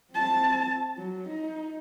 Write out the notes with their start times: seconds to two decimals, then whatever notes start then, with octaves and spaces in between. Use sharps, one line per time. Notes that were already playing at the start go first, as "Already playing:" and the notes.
0.12 C4 A5
0.97 F#3
1.28 D#4